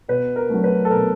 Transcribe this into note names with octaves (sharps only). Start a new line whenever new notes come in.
B2 B4
A#4
F#3 A3
B4
A4
B2 A#4